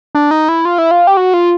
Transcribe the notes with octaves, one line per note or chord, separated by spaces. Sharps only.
D4
D#4
E4
F4
E4
F4
G4
F#4
F4